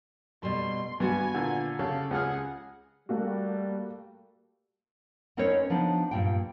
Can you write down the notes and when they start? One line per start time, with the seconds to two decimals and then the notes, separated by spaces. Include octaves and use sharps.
0.43 B2 G3 A3 C6
1.00 G2 B3 F#4 G4 G#5
1.35 A#2 D3
1.79 C#3 G4 A4
2.11 C#2 G#4 F#5 F6
3.09 G3 A3 A#3 F#4
5.37 C4 C#4 D#4 A#4 B4 C#5
5.70 F3 B3 D4 D#4
6.11 G2 A#2 G5